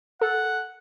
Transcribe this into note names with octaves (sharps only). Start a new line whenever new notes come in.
A4 F#5